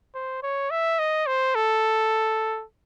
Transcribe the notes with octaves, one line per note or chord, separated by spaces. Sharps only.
C5
C#5
E5
D#5
C5
A4